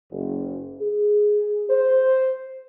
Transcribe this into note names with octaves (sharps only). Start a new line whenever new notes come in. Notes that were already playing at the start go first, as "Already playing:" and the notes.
F#1
G#4
C5